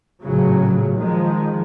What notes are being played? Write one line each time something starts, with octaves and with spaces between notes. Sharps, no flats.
A#1 A2 C#3 F#3
D#3 F3 G#3